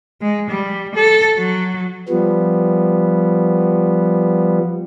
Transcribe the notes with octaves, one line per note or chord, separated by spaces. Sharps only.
G#3
G3
A4
F#3
F3 G3 B3